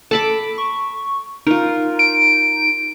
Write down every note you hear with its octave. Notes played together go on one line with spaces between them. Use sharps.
A4 A5 B5 D6
C#6
D#4 F4 A#4
D7